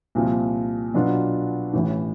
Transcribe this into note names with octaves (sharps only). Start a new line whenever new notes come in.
C2 A#2 F3
B2 F#3 B3 D4 F4
A1 A2 E3